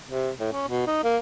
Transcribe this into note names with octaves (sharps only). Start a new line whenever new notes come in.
C3
A2
C#4
B2
D#4
A#3